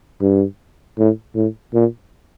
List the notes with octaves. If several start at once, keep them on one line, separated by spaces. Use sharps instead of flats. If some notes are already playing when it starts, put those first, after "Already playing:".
G2
A2
A2
A#2